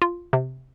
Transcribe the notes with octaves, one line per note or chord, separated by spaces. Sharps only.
F4
C3